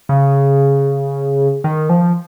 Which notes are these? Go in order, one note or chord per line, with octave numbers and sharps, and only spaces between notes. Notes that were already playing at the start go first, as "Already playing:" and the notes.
C#3
D#3
F3